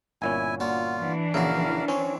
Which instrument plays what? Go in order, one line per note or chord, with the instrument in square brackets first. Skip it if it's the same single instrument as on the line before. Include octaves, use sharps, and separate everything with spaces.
[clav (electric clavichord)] G1 A#2 C#4 [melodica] E4 G#5
[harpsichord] D3 A#3 F#4 [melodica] F4
[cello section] E3 D4
[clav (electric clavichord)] A#1 C#3 [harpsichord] E4 F#4 [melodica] A#4 F5
[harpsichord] C4 C#5 [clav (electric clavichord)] C#4